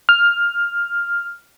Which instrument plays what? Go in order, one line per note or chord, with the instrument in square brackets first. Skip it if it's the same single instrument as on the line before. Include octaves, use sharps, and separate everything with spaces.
[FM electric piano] F6